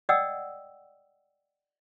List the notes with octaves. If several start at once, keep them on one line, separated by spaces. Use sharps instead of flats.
D5 D#5 F#5 G5 D#6 E6